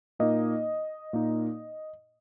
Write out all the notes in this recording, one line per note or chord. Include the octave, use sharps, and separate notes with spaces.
A#2 A#3 D#4 D#5
A#2 A#3 D#4